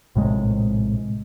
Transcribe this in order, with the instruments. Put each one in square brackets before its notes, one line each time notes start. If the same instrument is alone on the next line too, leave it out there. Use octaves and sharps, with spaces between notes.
[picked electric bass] A#1 A2 C3 G#3